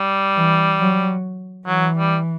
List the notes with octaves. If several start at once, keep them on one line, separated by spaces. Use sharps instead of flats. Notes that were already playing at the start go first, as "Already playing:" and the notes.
Already playing: G3
E3
F#3
E3 F#3
G3